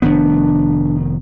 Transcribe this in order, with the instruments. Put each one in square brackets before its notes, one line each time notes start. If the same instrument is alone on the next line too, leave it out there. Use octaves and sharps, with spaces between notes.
[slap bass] F1 D#3 B3 [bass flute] D4